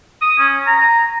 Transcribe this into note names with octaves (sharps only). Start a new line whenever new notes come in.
D#6
C#4
A#5